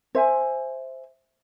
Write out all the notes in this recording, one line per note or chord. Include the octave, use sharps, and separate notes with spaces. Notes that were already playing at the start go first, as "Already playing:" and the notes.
C5 E5 G#5